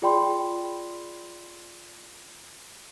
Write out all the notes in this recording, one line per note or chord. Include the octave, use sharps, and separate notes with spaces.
F4 G#4 D5 G5 B5 C6